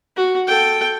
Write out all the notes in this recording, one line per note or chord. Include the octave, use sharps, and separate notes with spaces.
F#4
A4 G5